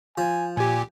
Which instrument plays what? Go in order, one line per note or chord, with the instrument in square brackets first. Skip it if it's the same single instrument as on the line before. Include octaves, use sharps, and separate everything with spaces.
[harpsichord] F3 [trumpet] G#5
[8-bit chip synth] A#2 G4 [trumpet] G#5